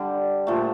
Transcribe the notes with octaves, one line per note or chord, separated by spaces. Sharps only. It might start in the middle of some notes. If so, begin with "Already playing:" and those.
Already playing: D3 G3 D4
A#2 F3 A3